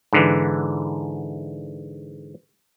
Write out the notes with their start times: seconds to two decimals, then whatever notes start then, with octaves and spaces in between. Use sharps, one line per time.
0.13 G#2 D3 E3